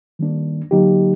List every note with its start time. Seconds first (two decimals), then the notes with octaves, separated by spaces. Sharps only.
0.19 D#3 G3 A#3 D4
0.71 D3 F#3 A#3 D#4 G4